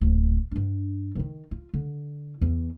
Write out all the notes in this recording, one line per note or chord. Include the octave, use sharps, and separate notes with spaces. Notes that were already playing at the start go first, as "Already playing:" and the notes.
D1 A#1
G2 D4
A1 D#3
F4
D3
E2 E3